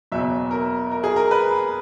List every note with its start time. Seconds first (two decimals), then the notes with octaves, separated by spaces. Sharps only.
0.12 F#1 E2 B2 F#3 E5
0.51 A#4
0.91 A#4
1.04 G#4
1.16 A#4
1.31 B4